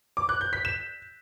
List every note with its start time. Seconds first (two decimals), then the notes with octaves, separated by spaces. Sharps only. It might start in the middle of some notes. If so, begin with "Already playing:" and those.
0.17 D6
0.29 F#6
0.41 G6
0.53 B6
0.65 E7